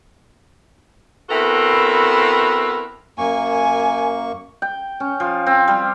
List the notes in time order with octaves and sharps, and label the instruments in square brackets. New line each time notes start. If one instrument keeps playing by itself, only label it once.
[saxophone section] B3 C4 E4 F#4 A4 A#4
[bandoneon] F#2 A#3 C#6 [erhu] G#5
[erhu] G#5
[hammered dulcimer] G5
C#4
F3
C4
G3